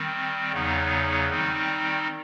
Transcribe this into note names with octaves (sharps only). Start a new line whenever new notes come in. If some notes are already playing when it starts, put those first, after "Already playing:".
Already playing: D#3 G3 C4
E2 C#3 F#3 B3 D#4
D#3 G3 C4 D#4